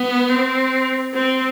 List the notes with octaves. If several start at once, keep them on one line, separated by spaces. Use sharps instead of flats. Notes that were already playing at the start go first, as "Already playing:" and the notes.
Already playing: B3
C4
C4